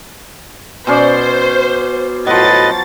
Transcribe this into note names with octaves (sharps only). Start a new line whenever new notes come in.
B2 C#4 C5 D5
A2 F3 F#3 B4 D#5 A6